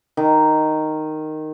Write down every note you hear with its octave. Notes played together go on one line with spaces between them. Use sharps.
D#3